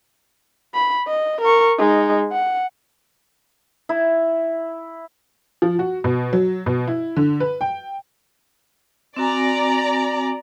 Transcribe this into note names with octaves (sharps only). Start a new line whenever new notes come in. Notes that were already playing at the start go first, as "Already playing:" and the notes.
B5
D#5
A#4 C#6
G#3 D#4
F#5
E4
F3
F#4
B2
F#3
B2
E4
D3
B4
G5
C4 F#4 D5 G#5 A#5